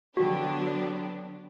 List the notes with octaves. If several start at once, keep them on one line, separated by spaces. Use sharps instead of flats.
D3 F#3 B3 D4 F#4 G4